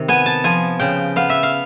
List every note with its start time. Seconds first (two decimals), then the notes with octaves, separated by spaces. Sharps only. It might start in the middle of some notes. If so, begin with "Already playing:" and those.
Already playing: C3 D#3
0.08 B3 G#5
0.26 A5
0.44 F3 G#5
0.80 C#3 G5
1.16 B3 F5
1.30 E5
1.43 F5